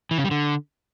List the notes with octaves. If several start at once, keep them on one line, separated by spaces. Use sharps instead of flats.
E3
C#3
G3
D3